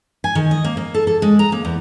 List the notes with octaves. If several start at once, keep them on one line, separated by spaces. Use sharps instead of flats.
G#5
D#3
D#5
A#3
A#3
A4
A4
G#3
A#5
A#3
E2